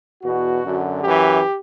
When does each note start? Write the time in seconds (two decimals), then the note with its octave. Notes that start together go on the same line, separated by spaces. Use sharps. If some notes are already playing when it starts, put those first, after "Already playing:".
0.23 E2 B2 F#4
0.62 F#2 D3
1.01 F#2 E3 G4